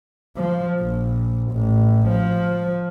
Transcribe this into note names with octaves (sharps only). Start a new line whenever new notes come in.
F3
A#1
A1
F3